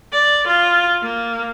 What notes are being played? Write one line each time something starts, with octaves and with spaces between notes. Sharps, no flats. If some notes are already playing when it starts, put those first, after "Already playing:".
D5
F4
A#3